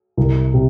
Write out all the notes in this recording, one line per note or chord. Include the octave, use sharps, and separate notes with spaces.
C2
C3